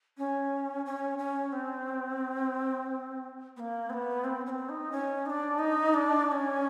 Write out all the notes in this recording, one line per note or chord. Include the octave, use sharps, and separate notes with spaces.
C#4
C#4
C#4
C4
B3
A#3
C4
B3
C4
C#4
C4
D#4
C#4
D#4
D4
D#4
D4
D4
C#4